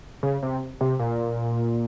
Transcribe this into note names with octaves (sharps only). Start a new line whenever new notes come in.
C#3
C3
C3
A#2